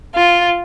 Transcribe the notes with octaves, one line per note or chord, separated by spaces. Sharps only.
F4